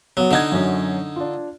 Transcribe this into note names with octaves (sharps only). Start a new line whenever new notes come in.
F#3 B3 F#4
D3 D#4 D#5 F#5 G#6
F#2 F#3 C#4
D4 F4